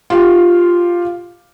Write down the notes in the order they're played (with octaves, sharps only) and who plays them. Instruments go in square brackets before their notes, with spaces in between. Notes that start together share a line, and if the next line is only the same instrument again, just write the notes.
[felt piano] F4 G4